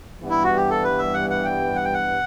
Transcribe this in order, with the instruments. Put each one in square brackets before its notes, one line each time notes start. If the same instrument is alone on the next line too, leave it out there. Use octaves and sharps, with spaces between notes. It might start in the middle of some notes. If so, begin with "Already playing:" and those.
[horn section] G2 E3 G3 B3
[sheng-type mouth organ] E4
F#4
G4
A4
B4
E5
F#5
F#5
G5
F#5
G5
F#5